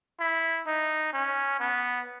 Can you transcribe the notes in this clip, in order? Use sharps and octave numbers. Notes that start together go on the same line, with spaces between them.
E4
D#4
C#4
B3